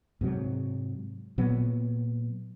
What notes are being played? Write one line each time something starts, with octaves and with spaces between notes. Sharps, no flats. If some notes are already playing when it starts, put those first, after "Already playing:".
G#2 C3 F#3
A#2 F#3 B3